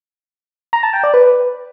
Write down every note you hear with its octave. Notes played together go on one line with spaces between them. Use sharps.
A#5
A5
G5
D5
B4